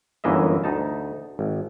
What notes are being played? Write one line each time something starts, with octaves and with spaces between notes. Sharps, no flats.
G1 F#2 E3 A#3 D#5 E5
D2 D#4 A5
G#1